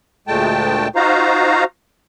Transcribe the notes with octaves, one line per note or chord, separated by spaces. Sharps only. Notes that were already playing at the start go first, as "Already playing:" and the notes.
D2 A#2 G#3 A3 G5 A5
D#4 F4 F#4 C5 F5 A#5